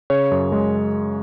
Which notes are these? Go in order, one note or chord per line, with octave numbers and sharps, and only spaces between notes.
C#3 C#5
F#2
G#3